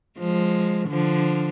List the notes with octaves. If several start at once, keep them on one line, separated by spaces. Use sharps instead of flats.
F3 G#3
D3 F3